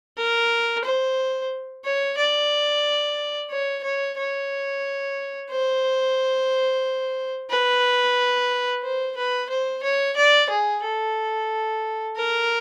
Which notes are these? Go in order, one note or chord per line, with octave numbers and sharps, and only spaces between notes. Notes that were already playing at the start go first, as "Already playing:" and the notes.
A#4
C5
C#5
D5
C#5
C#5
C#5
C5
B4
C5
B4
C5
C#5
D5
G#4
A4
A#4